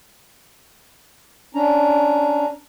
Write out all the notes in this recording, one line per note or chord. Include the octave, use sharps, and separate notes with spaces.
C#4 D4 A#5